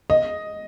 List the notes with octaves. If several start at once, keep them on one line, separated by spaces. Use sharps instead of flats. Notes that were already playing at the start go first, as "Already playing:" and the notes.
D#5